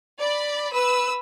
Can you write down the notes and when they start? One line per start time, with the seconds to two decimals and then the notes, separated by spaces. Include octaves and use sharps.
0.20 D5 B5
0.72 B4 E6